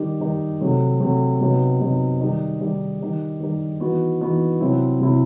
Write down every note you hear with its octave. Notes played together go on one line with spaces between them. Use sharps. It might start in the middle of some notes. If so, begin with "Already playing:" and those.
Already playing: D#3 G3 D#4 G4
D#3 G3 D#4 G4
C3 F#3 A3
C3 F#3 A3
C3 F#3 B3 D#4
C3 F#3 B3 D#4
D#3 G3 D#4
D#3 G3 D#4
D#3 G3 D#4 G4
D#3 G3 D#4 G4
E3 B3 D#4 F#4
E3 B3 D#4 F#4
C3 F#3 C4 E4
C3 F#3 C4 E4